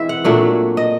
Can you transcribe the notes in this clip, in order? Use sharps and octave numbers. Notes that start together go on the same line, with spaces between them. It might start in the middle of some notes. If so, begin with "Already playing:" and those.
Already playing: E3 G#3 C4 E4 E5
F#5
A#2 F#3 A3 D4
D#5